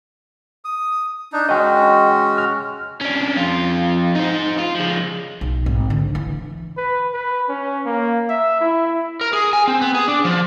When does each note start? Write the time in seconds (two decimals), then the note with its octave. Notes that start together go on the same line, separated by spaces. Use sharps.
0.65 D#6
1.33 D4 D#4
1.49 G#3 C#4 F#4 D#5 G5
2.38 F6
3.01 C#4 D4
3.36 F2 F4
4.16 D#4 C5
4.59 F4
4.76 F3 G#3
5.41 B1
5.66 G#1
5.90 D3
6.15 E3
6.77 B4
7.13 B4
7.49 C#4
7.86 A#3
8.29 E5
8.61 E4
9.21 A#4
9.33 G#4
9.53 G#5
9.68 C4
9.81 B3
9.95 G#4
10.08 D4
10.25 F3